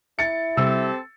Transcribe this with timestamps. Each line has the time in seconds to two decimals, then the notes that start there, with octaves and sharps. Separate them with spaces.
0.19 E4 A6 C#7
0.57 C3 G3 C4 G4 A4 E6